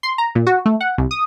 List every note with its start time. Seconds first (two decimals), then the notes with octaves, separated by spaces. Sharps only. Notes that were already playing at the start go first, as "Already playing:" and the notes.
0.03 C6
0.18 A#5
0.35 A#2
0.47 F#4
0.66 A3
0.81 F#5
0.98 C2
1.11 D#6